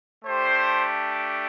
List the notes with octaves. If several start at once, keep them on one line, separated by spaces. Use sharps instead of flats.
A3 D4 G4 C5